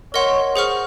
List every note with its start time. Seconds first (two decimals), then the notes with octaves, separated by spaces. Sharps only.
0.14 A#4 C#5 D#5 F#5 C6
0.56 G#4 C5 F#5 C#6 F6